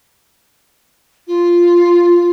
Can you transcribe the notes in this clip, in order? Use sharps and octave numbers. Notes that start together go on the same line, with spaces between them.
F4